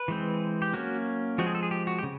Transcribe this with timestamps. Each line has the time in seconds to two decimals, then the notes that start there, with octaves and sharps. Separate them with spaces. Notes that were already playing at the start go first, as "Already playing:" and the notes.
Already playing: B4
0.08 E3 G#3 C4
0.62 G4
0.73 F#3 A#3 C#4 F#4
1.38 F3 G#3 C4 F#4
1.46 G#4
1.55 A4
1.63 G#4
1.71 G4
1.87 F#4
1.98 G4
2.03 C#3